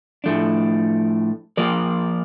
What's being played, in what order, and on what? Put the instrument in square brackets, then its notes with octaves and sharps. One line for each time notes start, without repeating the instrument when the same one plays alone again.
[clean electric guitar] A2 F3 A3 D4
F3 A#3 F4 A#4 D5